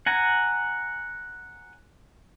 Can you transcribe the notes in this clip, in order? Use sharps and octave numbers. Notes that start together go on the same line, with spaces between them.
F#5 G#5 A#5